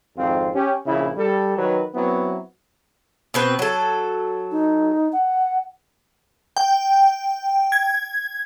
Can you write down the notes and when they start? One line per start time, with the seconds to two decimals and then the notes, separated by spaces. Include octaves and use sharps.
0.17 G#1 F2 C4 F4
0.54 C#4 G4
0.86 A#1 C#3 E4
1.16 G3 A4
1.58 D#3 F#3 B4
1.94 F#3 B3 C4 E4
3.34 B2 C4 B4
3.59 F#3 A4
4.51 D#4
5.12 F#5
6.57 G5
7.72 G#6